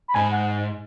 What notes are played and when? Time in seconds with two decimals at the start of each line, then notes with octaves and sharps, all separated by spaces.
0.08 B5
0.15 G#2 G#5
0.31 F#5